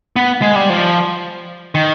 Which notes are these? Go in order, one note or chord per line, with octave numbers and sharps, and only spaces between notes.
B3
G#3
G3
F3
D#3